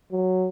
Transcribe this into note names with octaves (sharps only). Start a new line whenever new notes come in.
F#3